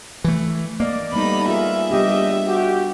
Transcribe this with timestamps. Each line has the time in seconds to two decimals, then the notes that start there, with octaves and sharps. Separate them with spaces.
0.24 E3 A3
0.80 A#3 D5 D#5
1.13 G3 A3 B3 D#4 B5
1.48 F4 G#4 A#4 E5
1.90 G3 B3 D4 G4 D#5
2.47 F#4 G4